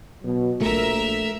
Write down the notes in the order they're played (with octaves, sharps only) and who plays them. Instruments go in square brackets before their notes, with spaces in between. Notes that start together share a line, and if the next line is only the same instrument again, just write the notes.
[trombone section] B2 F#3
[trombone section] A#1 [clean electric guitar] A3 [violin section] A#4 E5